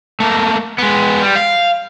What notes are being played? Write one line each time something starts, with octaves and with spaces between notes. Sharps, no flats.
A3 A#3
G#3 B3
G3
F5